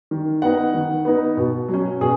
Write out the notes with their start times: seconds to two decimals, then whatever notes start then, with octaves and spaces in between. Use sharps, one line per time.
0.11 D#3
0.42 B3 D#4 F#5
0.74 D#3
1.05 B3 D#4
1.37 B2
1.68 F#3
1.74 C#4
2.01 B2 G#4